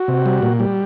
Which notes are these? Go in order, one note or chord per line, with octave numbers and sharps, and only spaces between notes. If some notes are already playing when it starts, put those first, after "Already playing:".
Already playing: F#4
C3
G3
A#2
G3